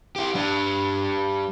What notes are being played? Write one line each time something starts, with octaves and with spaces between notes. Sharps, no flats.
E4 G4
G3 D4